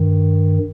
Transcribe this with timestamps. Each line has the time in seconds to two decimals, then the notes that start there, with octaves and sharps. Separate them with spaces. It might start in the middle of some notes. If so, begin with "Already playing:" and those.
Already playing: G2 D#3